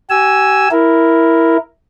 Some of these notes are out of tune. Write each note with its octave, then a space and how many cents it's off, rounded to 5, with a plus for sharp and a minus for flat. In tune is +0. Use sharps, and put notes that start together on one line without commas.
G4 -40 G#5 +0 E6 +0
E4 +0 A#4 +0